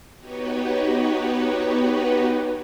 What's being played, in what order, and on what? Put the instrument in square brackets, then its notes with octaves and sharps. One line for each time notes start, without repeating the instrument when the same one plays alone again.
[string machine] B3 D#4 F#4 G4 B4 C#5